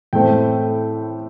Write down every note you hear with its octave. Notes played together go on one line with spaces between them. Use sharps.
A2 A3 C4 G5